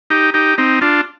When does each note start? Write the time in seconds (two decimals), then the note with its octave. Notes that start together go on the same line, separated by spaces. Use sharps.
0.10 D#4 G4
0.34 D#4 G4
0.58 C4 D#4
0.81 D4 F4